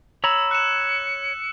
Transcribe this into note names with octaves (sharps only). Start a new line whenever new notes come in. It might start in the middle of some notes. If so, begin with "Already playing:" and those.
C#5 A#5 B5 E6 E7
F#6 C#7 E7